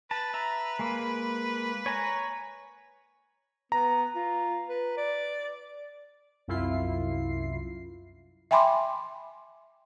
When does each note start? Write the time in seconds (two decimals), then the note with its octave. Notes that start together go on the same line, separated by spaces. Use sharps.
0.11 B4 A5
0.34 E5 A#5
0.79 G#3 A#3
1.86 C#5 G#5 A#5
3.72 B3 A#5
4.15 F4
4.68 B4
4.97 D5
6.48 C2 F#2 E4 F4 C7
8.51 E5 G5 G#5 B5 C6 D6